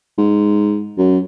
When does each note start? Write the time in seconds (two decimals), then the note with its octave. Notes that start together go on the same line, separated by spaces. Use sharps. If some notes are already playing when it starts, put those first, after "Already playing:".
0.18 G#2
0.98 F#2